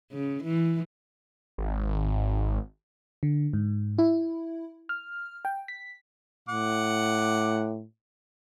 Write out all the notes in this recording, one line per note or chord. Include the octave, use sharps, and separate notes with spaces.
C#3
E3
G#1
D3
G#2
E4
F6
G5
B6
A2 F#5 D6